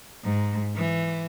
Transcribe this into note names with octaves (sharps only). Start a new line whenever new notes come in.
G#2
E3